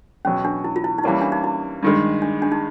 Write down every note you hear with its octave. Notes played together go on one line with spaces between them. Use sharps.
E2 B2 F#3 C#4
D4
E4
F4
E4
D#4
E3 G3 A#3 C#4 E4
D4
D#4
E4
G2 D#3 G#3
D4
D4
D#4